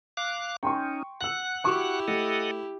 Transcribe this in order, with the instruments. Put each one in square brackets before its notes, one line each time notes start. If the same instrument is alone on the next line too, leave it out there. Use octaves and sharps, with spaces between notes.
[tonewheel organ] F5 D6 F#6
[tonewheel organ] C#4 D#4 [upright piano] G5 C6 C#6
[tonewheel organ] F#5 F#6 [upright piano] E6 F#7
[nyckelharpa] E4 G4 [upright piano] F#4 C#6 D6
[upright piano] A3 [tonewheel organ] A4 D#5 F#5